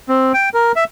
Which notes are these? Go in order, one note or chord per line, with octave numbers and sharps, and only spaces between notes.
C4
G5
A#4
E5